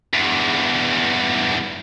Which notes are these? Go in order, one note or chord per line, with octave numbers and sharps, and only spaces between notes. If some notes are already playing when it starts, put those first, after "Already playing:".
E2 G2